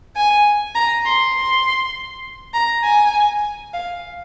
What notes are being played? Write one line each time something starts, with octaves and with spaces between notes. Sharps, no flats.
G#5
A#5
C6
C6
A#5
G#5
F5